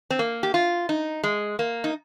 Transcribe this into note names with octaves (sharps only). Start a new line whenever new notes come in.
C4
A#3
G4
F4
D#4
G#3
A#3
D#4